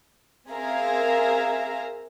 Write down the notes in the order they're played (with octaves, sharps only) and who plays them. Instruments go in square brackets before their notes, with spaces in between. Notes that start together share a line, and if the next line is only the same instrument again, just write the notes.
[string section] C4 G#4 A#4 E5 F5 A#5